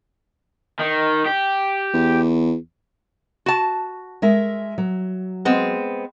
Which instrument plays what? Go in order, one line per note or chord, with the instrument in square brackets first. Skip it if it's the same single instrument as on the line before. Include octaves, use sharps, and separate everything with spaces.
[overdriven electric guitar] D#3
G4
[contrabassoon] E2
[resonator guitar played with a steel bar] F#4 A5
[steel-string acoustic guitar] G#3 A#4 E5
F#3
[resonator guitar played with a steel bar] G#3 B3 C4